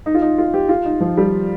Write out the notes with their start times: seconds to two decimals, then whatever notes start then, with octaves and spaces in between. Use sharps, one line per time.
0.06 D#4
0.14 F4
0.22 D#4
0.38 F4
0.54 G4
0.69 F4
0.85 D#4
1.00 F3
1.17 G3